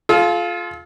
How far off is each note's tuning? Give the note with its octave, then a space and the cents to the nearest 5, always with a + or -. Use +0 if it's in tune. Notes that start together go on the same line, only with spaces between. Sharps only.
F4 +0 A4 -45